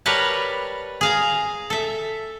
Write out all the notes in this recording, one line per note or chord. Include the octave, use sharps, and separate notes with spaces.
G3 A#4 B4 C#5 A5
G#4 F5 A#5
A4 E5